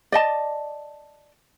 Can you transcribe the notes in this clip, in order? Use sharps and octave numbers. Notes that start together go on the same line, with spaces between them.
D5 D#5 A5